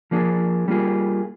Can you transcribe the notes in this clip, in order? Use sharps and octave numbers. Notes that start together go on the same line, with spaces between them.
F3 A#3 D4 G#4
G3 A#3 F4 G#4